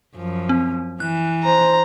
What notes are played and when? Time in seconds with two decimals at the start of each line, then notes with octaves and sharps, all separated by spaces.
0.16 F#2 F3
0.49 C4
1.00 E3 F#6
1.45 C5 A#5